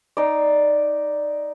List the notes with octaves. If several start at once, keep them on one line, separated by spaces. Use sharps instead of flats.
D#4 D5